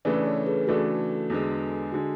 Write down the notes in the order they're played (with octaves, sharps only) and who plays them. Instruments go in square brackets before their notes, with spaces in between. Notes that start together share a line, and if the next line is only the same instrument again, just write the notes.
[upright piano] C#3 E3 A3 D4 [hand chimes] B4 D5
[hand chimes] A4 C#5
G#4 B4
[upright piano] C#3 E3 A3 D4 [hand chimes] F#4 A4
[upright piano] E2 D3 G#3
[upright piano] D3 G#3 [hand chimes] F#4